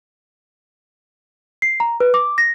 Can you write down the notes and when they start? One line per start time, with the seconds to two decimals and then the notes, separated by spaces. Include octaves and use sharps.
1.62 C7
1.80 A#5
2.00 B4
2.14 D6
2.38 A#6